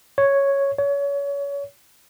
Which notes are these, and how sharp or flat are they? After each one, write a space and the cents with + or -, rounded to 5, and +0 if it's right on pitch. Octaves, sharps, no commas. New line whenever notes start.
C#5 +0
C#5 +30